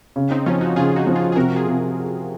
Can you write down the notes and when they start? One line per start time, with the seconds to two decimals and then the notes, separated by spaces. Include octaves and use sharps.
0.16 C#3
0.31 C4 D#4
0.46 F3 C#4 F4
0.61 D#4 F#4
0.76 C#3 F4 G#4
0.96 D#4 F#4
1.07 F3
1.16 F4 G#4
1.32 G#4
1.36 C3 F#4 A#4
1.56 F4 G#4
1.66 C3